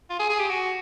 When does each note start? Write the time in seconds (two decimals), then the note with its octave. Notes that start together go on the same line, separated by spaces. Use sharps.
0.10 F4
0.19 G#4
0.29 G#4
0.39 G4
0.50 F#4